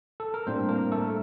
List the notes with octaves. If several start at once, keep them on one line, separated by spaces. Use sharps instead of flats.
A4
A#4
A2 G3 A#3 C4 D4 C5
A#3 A#4
A3 A4